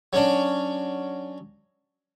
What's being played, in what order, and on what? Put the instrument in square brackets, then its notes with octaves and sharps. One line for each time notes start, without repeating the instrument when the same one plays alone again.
[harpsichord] F#3 C#4 D4